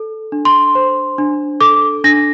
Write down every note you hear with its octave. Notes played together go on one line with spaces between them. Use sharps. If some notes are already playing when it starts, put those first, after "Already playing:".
Already playing: A4
D4
C6
C5
D4
A4 D6
D4 A#6